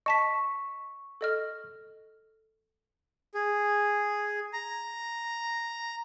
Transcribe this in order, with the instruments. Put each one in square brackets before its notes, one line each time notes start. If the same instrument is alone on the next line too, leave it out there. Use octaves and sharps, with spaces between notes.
[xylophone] D#5 A5 B6 [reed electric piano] C#6
[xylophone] A4 D#5 F6
[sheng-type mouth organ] G#4
A#5